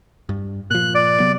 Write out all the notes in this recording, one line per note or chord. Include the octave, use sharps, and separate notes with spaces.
G2
A#2 F3 F#6
D5
C3 F#3 B3